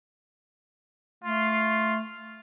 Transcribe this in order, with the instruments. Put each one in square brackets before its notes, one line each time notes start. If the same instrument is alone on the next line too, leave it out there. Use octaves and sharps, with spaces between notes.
[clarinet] A3 [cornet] F4